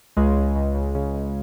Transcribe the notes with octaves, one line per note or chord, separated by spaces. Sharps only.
C#2 G#3
C#2
C#2
C#2
C#3
C#3